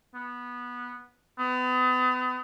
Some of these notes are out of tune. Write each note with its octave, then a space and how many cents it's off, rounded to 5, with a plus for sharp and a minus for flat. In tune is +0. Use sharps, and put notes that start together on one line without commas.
B3 -15
B3 +35